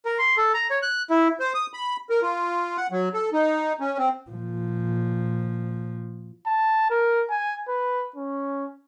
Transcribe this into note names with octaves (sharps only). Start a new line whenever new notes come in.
A#4
C6
A4
A#5
C#5
F#6
E4
C5
D#6
B5
A#4
F4
F#5
F#3
A4
D#4
C#4
C4
A#2 F3
A5
A#4
G#5
B4
C#4